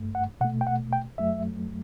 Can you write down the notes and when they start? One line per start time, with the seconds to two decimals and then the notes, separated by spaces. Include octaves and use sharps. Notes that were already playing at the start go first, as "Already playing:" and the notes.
Already playing: G2 A3
0.15 F#5
0.41 B2 F#5
0.45 A3
0.61 G5
0.67 F#5
0.93 G5
1.18 F#2 F#3 A3 E5